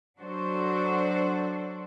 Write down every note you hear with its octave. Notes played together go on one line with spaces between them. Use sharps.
F#3 D4 F#4 A4 C5